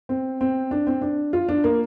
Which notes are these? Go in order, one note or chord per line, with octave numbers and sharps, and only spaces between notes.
C4
C4
D4
C4
D4
F4
D4
A#3